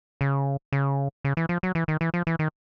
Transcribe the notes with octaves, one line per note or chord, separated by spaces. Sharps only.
C#3
C#3
C#3
E3
F3
F#3
E3
D#3
E3
F3
E3
D#3